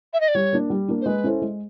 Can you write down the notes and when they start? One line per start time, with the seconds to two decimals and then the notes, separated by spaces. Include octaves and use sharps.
0.13 E5
0.20 D#5
0.28 D5
0.35 G3 C#5
0.53 A#3 D4
0.70 G3
0.88 A#3 D4
1.01 C5
1.06 G#3 B4
1.24 C#4 E4 A4 C5
1.41 G#3